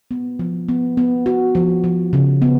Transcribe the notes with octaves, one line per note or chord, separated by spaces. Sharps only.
B3
F3
B3
B3
F#4
F3
F3
C#3
B3